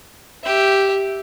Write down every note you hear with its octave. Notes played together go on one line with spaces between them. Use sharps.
G4 E5